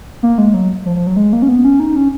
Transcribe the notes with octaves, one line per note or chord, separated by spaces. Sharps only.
A#3
G#3
F#3
F3
F3
F#3
G#3
A#3
C#4
B3
C#4
D#4
C#4